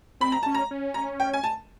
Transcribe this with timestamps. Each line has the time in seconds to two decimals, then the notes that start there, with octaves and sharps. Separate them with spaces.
0.20 C4 B5
0.32 A#5
0.43 C#4 A5
0.55 A#5
0.71 C#4
0.94 A#5
1.20 G5
1.33 G#5
1.44 A5